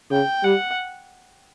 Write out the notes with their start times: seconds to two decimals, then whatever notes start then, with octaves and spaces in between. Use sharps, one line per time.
0.11 C#3 G5
0.44 G3 F#5